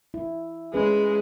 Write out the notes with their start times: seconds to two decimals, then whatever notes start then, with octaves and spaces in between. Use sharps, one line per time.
0.14 E4
0.74 G#3 C#4 G#4 B4